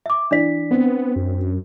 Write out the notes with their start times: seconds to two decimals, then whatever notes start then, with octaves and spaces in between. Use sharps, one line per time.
0.06 E5 D6
0.31 E3 D4 D5 B6
0.71 B3 C4
1.16 F#2